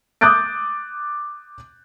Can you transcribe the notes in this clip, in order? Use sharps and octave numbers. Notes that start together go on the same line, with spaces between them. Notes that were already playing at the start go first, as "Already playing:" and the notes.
D6 D#6 F#6 G6 A6 D7